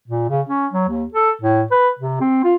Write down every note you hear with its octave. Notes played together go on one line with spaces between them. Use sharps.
A#2
C#3
C#4
F#3
D#2
A4
A2
B4
C3
C4
F4